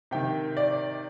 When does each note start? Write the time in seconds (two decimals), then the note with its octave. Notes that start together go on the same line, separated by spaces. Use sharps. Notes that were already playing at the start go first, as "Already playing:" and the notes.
0.11 C3 D#3 G5
0.57 D5